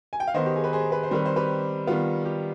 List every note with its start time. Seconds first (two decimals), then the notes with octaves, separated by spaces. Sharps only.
0.13 G#5
0.20 G5
0.27 F5
0.34 D#3 B3 C5 D#5
0.46 G4
0.56 G#4
0.64 B4
0.73 G#4 C5
0.92 B4
1.03 C5
1.11 D#3 G3 C4 B4
1.26 C5
1.36 G4 B4
1.87 D#3 G3 B3 F4
2.25 G4